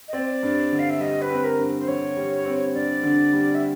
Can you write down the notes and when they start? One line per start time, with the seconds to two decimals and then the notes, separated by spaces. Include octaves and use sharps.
0.08 D#5
0.13 C4 D5
0.43 G2
0.72 D3
0.79 F5
0.90 E5
1.00 G3 D#5
1.22 B4
1.30 C4
1.44 A#4
1.58 G2
1.78 C5
1.87 D3 C#5
2.16 G3
2.45 C4
2.74 G2 D5
3.03 D3
3.33 G3
3.55 E5